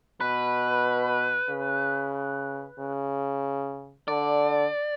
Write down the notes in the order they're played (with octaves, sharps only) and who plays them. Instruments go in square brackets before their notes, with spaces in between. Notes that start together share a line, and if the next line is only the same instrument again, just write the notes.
[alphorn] B2 [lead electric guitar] B4
[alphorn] C#3
C#3
[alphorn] D3 [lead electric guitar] D5